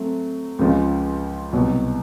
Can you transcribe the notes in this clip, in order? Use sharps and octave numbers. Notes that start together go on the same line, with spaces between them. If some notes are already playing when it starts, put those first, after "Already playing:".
Already playing: F#3 A3 C4
C#2 C#3 F3 G#3
C2 B2 F#3